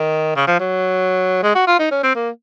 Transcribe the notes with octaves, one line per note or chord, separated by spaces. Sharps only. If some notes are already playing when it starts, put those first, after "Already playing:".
Already playing: D#3
C#3
F3
F#3
G#3
F#4
F4
D#4
C#4
C4
A#3